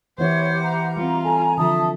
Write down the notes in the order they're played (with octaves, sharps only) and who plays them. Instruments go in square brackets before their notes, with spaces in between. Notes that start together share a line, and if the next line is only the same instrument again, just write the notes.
[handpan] E3 B3 E4 [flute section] G4 F#5 [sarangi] C5 [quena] C#5
[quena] A#5
[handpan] G3 C4 [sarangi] F4
[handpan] A4 [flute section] G#5
[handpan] D3 F3 [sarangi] A4 [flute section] E5 A5 D#6